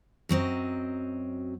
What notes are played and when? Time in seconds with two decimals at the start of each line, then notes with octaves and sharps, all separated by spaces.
0.29 F#2 F#3 C4 D#5